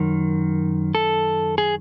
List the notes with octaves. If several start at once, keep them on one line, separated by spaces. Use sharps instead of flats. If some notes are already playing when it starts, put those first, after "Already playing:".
Already playing: F#2 D#3
A4
G#4